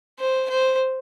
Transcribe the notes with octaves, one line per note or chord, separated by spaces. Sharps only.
C5
C5